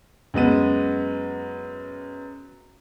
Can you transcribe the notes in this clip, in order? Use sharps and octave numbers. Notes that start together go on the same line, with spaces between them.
F#2 G#3 B3 D#7